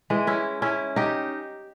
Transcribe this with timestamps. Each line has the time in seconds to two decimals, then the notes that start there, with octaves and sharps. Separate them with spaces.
0.10 E3 G#3
0.27 C#4 E4
0.62 C#4 E4
0.96 D#4 G4